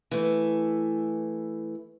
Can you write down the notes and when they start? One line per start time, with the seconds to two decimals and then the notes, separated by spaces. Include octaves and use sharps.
0.11 E3 A3